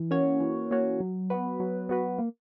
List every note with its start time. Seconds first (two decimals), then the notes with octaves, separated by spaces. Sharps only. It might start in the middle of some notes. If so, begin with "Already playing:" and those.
Already playing: E3
0.11 A#3 C#4 F#4 C#5
0.40 E3
0.71 A#3 C#4 F#4 C#5
1.00 F#3
1.30 B3 F#4 B4
1.60 F#3
1.89 B3 F#4 B4
2.18 A#3